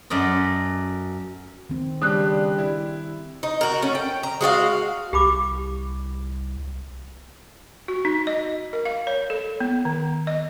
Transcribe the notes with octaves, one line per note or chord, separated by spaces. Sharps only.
F#2 A4 D5 D#5
D#3 C4
C#3 G3 D4 G4 D#6 F#6
E4
D#4
F#4 A#4
A3 C#4
G5
A#5
G#3 F#4 G4 F5
C2 G4 B5 D6
F#4
D#4
D#5
A#4
F5
C#5
A4
B3
D#3
D#5